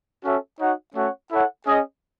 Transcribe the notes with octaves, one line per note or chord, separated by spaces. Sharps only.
C#4 F#4 A4 C#5 E5
D#4 F#4 C#5 F#5
A3 C#4 F#4 C#5 F#5
E4 A4 C#5 F#5
C#4 G#4 D#5